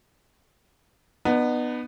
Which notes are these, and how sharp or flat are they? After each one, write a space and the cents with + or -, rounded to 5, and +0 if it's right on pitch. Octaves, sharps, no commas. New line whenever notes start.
B3 +0 D#4 -40